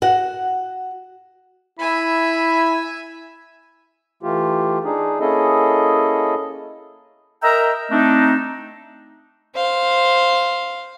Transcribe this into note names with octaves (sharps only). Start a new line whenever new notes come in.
F#4 F#5
E4 E5 G#5 B5
E3 A3 F4 G4
D4 D#4 G#4
A#3 C#4 E4 G#4 A4 D#5
A#4 D#5 E5 G5 A#5
A3 C4 D4 D#4
C5 F5